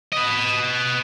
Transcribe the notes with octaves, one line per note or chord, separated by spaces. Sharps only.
B4 D#5